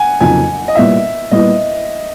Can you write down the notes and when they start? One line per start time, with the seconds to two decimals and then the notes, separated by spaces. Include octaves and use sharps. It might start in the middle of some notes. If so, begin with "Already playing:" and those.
Already playing: F#5 G#5
0.20 F2 C#3 F#3 A#3 D#4 G#5
0.68 D#5
0.75 A#2 G3 B3 E4 E5
1.31 A#2 G3 B3 E4 D#5